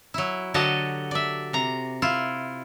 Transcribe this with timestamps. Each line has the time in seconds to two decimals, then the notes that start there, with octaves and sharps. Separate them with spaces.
0.14 F#3 E4
0.54 D3 F#3 F#4 G4 D#5 A5
1.11 D5 E5
1.53 C3 A#5
2.02 E4 F4